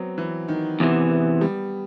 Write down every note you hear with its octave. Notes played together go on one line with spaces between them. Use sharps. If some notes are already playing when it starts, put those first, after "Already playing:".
Already playing: F#3 B3 C4
E3
D#3
E2 C3 E3 B3
B3
G3